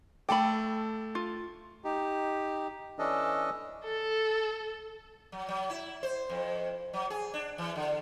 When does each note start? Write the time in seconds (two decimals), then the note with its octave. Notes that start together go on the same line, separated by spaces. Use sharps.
0.29 A3 A4 G5 B5 D6
1.15 F4
1.84 D#4 G4
2.99 E3 C#4 D4 A4 D#5
3.84 A4
5.32 F#3
5.48 F#3
5.70 E4
6.03 C5
6.30 F2
6.93 F#3
7.10 G#4
7.34 D4
7.58 E3
7.76 D3